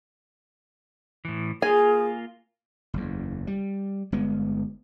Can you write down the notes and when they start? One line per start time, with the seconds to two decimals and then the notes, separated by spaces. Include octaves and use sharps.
1.25 A2 E3
1.62 A#3 F4 G#4 G#5
2.94 F#1 E2
3.47 G3
4.12 G1 G#3 B3